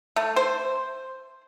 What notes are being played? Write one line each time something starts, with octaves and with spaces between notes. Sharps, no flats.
A3
C5